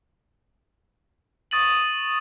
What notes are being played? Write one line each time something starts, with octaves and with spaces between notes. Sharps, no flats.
C#6 D#6 A6 D#7 F#7